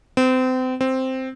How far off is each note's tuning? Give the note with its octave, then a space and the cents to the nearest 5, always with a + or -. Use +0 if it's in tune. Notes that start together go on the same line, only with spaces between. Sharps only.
C4 -30
C4 +0